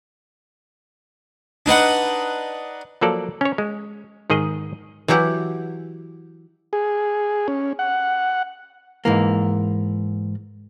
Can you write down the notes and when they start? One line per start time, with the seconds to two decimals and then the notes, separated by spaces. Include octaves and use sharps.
1.66 D4 D#4 B4 F#5
3.01 F3 F#3 A#3 A4 D5
3.41 C#4 C#5
3.58 G#3
4.30 G#2 D#3 G#4 D#5
5.08 E3 F#3 E4 G4 F#5
6.73 G#4
7.48 C#4
7.79 F#5
9.05 G#2 E3 A#3